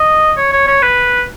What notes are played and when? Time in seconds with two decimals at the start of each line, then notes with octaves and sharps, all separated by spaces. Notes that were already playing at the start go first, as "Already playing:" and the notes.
Already playing: D#5
0.37 C#5
0.53 C#5
0.67 C#5
0.82 B4